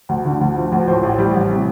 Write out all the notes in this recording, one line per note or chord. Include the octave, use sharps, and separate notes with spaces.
D2
D3
D2
F3
D2
A2 C5
A1
G3
A1
C3